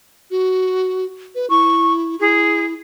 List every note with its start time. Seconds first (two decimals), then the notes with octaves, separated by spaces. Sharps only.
0.31 F#4
1.35 B4
1.50 E4 C#6
2.20 E4 G#4